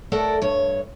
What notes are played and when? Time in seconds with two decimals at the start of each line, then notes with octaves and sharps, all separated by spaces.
0.12 A3 A4 A#4 D5 F#5
0.42 G2 C#5